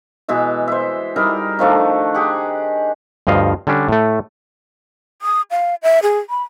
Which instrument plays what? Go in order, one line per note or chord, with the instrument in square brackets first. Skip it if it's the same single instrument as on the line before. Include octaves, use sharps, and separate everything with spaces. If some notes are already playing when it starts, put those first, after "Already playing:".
[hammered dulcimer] B2 E3 G#3 E5
C5 E5
G3 D#4 E4 A#4
D#3 F3 A3 D4
G4 G#4 F#5
[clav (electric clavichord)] D2 G2 F3 D#5 F5
D3 G3 C#4 D4
A2 A3
[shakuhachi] D#6
F5
E5
G#4
B5